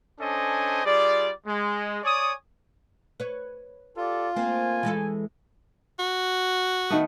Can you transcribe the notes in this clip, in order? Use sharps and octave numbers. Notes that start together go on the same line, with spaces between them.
C#4 D4 A4 C5 D#5 G#5
G3 F4 G#4 D5
G#3
C#5 D5 G#5 C#6 D#6
B4 C#5
F4 G4 A4 D5
A3 A#3 C4 G#5
E3 G#3 A4
F#4
D#3 A3 B3